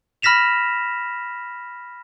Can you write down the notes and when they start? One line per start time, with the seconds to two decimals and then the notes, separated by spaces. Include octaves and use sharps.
0.22 B5 F6 A#6 B6 E7 F7